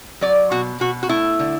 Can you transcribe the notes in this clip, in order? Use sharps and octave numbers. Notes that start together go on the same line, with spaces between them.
F#3 D5
B2 F#4
B2 F#4
F#4
A3 E4
D3